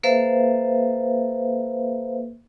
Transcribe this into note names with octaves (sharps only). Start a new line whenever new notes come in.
A#3 A4 B4 C5 E5 F5